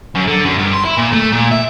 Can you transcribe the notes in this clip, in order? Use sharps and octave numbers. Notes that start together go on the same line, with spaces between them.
F#2
D3
F#2
G2
C6
E4
A#2
A3
A#2
E5